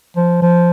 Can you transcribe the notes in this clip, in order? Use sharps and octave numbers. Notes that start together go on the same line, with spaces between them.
F3
F3